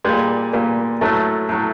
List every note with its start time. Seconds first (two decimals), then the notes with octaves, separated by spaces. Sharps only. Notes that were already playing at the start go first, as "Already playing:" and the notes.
0.04 A#2 G3 G#3
0.53 A#2 G3
1.01 A2 F#3 A3
1.49 A2 F#3